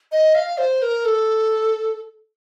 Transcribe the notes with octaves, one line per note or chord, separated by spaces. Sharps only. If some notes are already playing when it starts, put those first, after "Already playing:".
D#5
F5
C5
A#4
A4